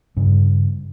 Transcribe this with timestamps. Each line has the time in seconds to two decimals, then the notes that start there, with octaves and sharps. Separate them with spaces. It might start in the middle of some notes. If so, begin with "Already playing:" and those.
0.17 G2 C#3